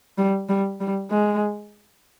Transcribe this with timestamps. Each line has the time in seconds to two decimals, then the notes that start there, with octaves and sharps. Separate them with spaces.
0.18 G3
0.49 G3
0.80 G3
1.10 G#3